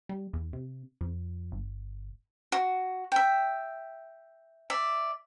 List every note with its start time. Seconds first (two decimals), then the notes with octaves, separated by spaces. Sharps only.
0.09 G3
0.33 E2
0.53 C3
1.01 F2
1.52 G1
2.52 F#4
3.12 E5 G5
4.70 D5 E5